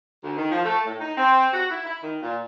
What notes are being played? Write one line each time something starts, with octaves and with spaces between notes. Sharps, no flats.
D2
D#3
F3
A3
A2
D#4
C4
F#4
E4
E4
D#3
A#2